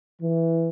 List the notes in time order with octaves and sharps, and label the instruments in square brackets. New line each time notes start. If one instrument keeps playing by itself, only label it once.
[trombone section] E3